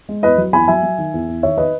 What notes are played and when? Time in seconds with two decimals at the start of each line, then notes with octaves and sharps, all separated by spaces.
0.09 G#3
0.23 E2 B4 D#5
0.38 F#3
0.53 E2 G#5 B5
0.68 F#3 E5 G#5
0.83 F#3
0.98 D#3
1.14 E2
1.28 E2
1.43 D#3 C#5 E5
1.58 D#3 B4 D#5